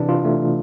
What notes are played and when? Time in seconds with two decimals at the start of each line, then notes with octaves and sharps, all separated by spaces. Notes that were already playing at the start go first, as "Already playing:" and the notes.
Already playing: C3 E3 D4
0.09 F4
0.25 A3